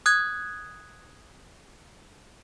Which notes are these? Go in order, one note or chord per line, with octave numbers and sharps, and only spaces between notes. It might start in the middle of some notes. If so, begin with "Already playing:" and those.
D#6 F#6 G#6